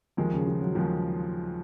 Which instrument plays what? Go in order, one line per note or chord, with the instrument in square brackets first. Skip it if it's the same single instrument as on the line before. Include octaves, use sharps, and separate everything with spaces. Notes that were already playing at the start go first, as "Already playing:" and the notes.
[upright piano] D#2 D#3 G#3 [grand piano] F3
[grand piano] C#3
F3
F#3
[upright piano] D#2 D#3 G#3 [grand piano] F3